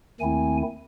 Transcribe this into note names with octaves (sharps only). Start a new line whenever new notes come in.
D#2 D#3 A3 C4 E4 G#5